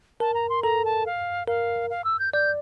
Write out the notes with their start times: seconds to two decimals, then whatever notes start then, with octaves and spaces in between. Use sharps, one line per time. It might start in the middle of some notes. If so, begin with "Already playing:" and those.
0.20 A#4 A5
0.34 A#5
0.49 C6
0.63 A4 A#5
0.85 A5
1.06 F5
1.48 A#4 F5
1.90 F5
2.04 E6
2.19 G6
2.33 D5 G6